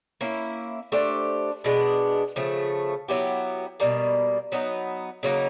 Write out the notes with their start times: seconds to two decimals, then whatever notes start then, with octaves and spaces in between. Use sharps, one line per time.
0.21 A#3 C#4 E4
0.92 A3 D4 G4 C5
1.64 B2 G#3 B3 D4
2.36 C#3 F3 A3
3.08 F#3 B3 E4 G4
3.80 B2 G3 A#3
4.52 F#3 B3 D#4
5.23 C#3 F#3 A#3 D#4